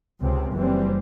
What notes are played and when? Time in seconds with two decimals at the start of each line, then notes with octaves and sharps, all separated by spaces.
0.20 C#2 C3 C4
0.54 F#1 E3 G3 C4